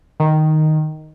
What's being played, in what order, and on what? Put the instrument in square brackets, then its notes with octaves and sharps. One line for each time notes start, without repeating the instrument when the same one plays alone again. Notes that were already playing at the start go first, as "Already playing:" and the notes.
[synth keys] D#3